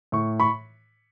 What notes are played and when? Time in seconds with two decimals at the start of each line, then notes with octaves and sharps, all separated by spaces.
0.12 A2 C#6
0.40 B5 C#6